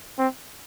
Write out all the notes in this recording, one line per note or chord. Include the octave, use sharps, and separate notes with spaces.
C4